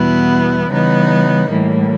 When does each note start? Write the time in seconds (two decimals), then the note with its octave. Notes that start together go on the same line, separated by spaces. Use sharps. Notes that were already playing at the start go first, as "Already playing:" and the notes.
Already playing: E2 B2 G3 B3 E4
0.70 C#3 E3 G3 B3 D#4
1.49 A2 E3 G3 A#3